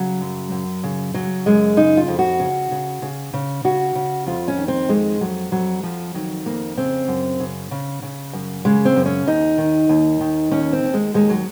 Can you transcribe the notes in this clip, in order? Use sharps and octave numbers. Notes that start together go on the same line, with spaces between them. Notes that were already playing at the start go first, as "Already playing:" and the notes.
Already playing: C#3 F#3
F#2
F#2
C#3
C#3 F#3
F#2 G#3
C#3 D#4
F4
F2
F#4
C#3
C#3
C#3
C#3
C#3 F#4
C#3
F2 F4
C#4
D#3
C4
F2 G#3
F2 F#3
F2 F#3
F2 F3
D#3 F#3
F2 A#3
C#3 C4
F#2
C#3
C#3
C#3
F#2
C#3 G#3
C4
F#2
C#4
D#2 D#4
D#3
D#2
D#3
D#2 C#4
C4
D#2
G#3
D#2 G#3
F#3